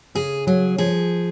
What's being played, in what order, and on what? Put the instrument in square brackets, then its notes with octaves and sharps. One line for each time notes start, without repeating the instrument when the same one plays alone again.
[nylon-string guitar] C#3 [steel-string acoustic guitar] G#4
[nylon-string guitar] F#3 [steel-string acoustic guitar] G#4
[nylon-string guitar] F3 [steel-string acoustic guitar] G#4